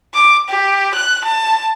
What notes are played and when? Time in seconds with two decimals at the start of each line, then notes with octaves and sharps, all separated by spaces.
0.14 D6
0.49 G4
0.94 F#6
1.25 A5